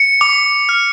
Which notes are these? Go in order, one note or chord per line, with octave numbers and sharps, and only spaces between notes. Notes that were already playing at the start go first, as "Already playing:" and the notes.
Already playing: C#7
D6
F6